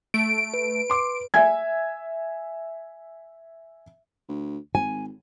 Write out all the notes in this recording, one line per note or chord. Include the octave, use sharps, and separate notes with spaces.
A3 D7
B4
C6 D6
E5 G#5 G#6
D2
G#1 G#5